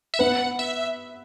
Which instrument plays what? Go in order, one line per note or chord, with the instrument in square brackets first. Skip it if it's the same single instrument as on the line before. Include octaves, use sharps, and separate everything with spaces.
[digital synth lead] E5
[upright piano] B3 B4 [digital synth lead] F#5
[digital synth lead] E5